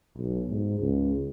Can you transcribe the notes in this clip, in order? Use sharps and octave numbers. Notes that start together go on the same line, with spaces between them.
B1
G#2
C#2